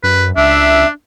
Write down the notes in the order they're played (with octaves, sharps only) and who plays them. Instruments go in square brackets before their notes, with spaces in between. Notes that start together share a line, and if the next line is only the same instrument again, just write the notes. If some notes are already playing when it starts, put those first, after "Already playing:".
[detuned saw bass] F#2 [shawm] B4
[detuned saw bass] C#2 [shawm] D4 [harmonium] E5